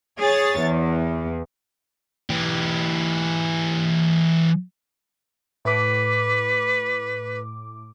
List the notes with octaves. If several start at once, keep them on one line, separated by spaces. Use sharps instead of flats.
G#4 C#5 A6
E2
E3 G4
A2 B4 D6